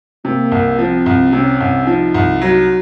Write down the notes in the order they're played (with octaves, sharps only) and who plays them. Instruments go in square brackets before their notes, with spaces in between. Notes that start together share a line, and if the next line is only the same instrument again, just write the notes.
[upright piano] C3 [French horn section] A#3
[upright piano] C2
[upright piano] F3 [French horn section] C4
[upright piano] C2
[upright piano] C3 [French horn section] C#4
[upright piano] C2
[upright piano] F3 [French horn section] D#4
[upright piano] C2
[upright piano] F#3 [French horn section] D#4